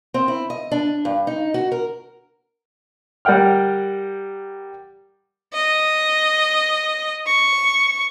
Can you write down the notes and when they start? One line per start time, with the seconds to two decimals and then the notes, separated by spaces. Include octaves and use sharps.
0.14 C4
0.28 E4
0.50 D#5
0.71 D4
1.05 G2
1.27 D#4
1.54 F#4
1.72 A#4
3.25 G3 A#4 F#5 G5 F6
5.54 D#5
7.27 C#6